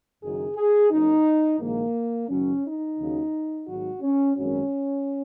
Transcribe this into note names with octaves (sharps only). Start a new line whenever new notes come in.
F#1 F#2 D#3 F#3 G#4
G#4
F#1 F#2 F#3 D#4
A#1 G#2 D#3 A#3
F#1 F#2 D#3 F#3 C#4
D#4
D#2 C#3 F#3
G#1 G#2 F#3 F#4
C#4
G#1 F#2 F#3 C#4